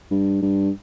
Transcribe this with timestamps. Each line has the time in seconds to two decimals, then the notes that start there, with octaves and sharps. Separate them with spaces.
0.11 G2
0.42 G2